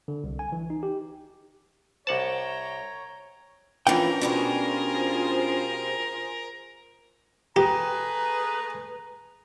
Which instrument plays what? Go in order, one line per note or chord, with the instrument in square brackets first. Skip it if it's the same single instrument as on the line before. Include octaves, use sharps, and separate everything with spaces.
[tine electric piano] D3
C2
G#5
E3
D#4
G4
[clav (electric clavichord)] C2 F#5 A5 [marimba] C5 D6 [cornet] C#5 [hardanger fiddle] G5 A#5
[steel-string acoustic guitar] E3 F3 [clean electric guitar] C#4 D4 G5 [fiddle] A#4
[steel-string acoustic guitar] B2 G3 C#5 [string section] F4 G#4 C5
[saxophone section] A3 G#4 B4 [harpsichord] G4 [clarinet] A#5